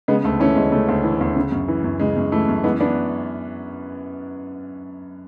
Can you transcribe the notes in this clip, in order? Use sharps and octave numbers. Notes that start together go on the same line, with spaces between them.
C#3 G#3 B3
D2 A3
E3 A3 C#4
D2 G#3
C#3 A3
D2
E3
D2
C#3
F#2
E3
F#2
C#3 G#3
F#2
E3 A3
F#2
E3 G#3 B3
E3 B3 D4